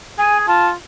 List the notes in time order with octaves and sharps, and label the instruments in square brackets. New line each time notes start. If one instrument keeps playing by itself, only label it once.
[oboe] G#4 [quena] G#5
[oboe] F4 [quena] A5